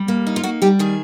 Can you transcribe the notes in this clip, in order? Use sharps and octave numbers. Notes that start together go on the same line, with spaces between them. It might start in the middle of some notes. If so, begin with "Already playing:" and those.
Already playing: G3
A#3
D#4
F4
A#3 F#4
G3 G4
D#3 G#4